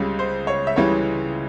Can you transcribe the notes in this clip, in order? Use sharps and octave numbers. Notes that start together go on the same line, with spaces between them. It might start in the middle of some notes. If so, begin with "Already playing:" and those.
Already playing: C#2 C#3 G3
C5
C#5
E5
C#2 C#3 E3 G3 C#5